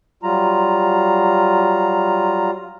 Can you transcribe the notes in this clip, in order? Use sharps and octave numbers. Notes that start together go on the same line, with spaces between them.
F#3 G3 F4 A#5